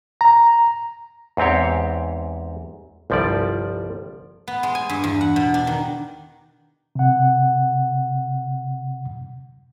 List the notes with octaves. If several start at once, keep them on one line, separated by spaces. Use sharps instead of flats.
A#5
E2 G#2 C4 G4 C#5
G1 C2 F3 G3 D5
B3
G#3
G#5
G2
E2
F#5
B2
D4
D#3
C3 F#5